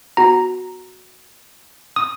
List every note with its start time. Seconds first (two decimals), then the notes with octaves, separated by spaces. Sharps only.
0.17 B3 F#4 A#5
1.96 D#6